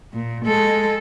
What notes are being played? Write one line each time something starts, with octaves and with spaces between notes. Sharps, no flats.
A#2
G#3 A4